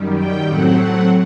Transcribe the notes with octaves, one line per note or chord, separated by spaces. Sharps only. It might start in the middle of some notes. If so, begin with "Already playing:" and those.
Already playing: F#2 D#3 G3
G5
A2 F#3 A3 C4 F#5
F#5